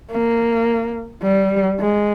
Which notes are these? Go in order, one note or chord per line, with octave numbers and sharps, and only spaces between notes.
A#3
G3
G#3